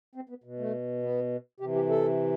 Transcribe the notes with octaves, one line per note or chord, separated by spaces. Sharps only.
C4
B3
B2
A3
B3
C3 E3 G4
G4
A4